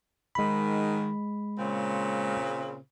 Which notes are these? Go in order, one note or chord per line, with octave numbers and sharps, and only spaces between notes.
G#2 D#3 G#3 B5
A#2 C#3 C4